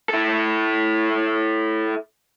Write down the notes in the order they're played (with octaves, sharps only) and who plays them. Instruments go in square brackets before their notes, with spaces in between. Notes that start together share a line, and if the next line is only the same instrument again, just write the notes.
[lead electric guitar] E4 A4